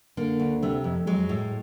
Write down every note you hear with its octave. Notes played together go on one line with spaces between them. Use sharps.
D3 A#3
D2
C3 A3
F2
F#3 G#3
A2